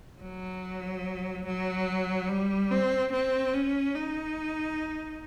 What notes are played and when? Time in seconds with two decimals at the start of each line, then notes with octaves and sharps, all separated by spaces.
0.21 F#3
1.46 F#3
2.29 G3
2.71 C4
3.13 C4
3.54 C#4
3.95 D#4